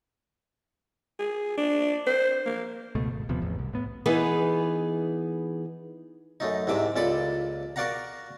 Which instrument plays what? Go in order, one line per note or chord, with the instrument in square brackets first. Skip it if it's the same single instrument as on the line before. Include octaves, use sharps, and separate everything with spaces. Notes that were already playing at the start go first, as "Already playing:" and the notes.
[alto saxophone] G#4
D4
C5
A#3
[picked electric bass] C#2 B2 A3
G#1
D#1 C3 F3 B3
A1 E2
C2
A2 B3
[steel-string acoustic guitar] E3 B3 D#4 G#4 B4
[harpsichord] F#2 A3 D#4
C2 G#2 C3 E5 D6
C#2 A#2 A4 D5 A5 B5
F#4 A#4 D5 F5 F#5 A#5